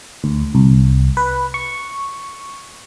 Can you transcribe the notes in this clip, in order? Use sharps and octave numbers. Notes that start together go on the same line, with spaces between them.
D2
C2
B4
C#6